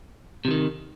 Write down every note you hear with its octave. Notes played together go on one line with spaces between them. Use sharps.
C3 D#3 F3